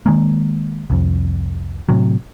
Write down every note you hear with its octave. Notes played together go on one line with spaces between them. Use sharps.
D#3 G#3 A#3
C2 F2
A2 C3 F#3